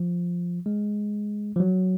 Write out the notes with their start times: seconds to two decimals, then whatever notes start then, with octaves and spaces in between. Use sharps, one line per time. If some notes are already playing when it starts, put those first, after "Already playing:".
Already playing: F3
0.66 G#3
1.56 F3
1.60 F#3